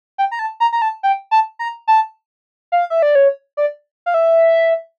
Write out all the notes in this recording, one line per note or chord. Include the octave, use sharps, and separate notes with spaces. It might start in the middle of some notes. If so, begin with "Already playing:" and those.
G5
A#5
A5
A#5
A#5
A5
G5
A5
A#5
A5
F5
E5
D5
C#5
D5
F5
E5